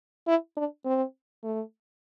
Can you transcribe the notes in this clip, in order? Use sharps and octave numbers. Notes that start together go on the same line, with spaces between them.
E4
D4
C4
A3